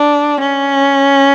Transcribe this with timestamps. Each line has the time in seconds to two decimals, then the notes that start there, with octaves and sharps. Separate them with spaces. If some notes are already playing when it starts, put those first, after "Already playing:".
Already playing: D4
0.40 C#4